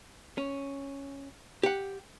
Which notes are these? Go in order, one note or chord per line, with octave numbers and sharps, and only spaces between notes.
C#4
G4 F#5